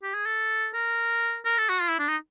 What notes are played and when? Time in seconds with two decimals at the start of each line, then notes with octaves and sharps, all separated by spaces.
0.03 G4
0.14 G#4
0.26 A4
0.74 A#4
1.45 A#4
1.58 A4
1.69 F#4
1.81 F4
1.90 E4
1.99 D4
2.08 D#4